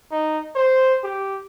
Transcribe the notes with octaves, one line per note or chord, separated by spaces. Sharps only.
D#4
C5
G4